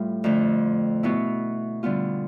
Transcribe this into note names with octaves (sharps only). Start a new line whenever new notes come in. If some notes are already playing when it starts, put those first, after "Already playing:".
Already playing: A2 G3 F4
F2 D3 A3
B2 B3 E4
D3 G3 B3 F4